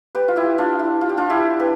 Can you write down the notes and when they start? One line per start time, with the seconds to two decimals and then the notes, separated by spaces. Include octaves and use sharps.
0.15 G4 B4
0.28 F4
0.36 E4 G4
0.58 D4 F4
0.79 E4
1.01 F4
1.09 G4
1.17 D4 F4
1.30 E4 G4
1.60 G4 B4